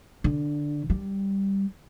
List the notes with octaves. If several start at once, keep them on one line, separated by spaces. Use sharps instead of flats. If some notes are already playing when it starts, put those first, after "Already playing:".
D3
G3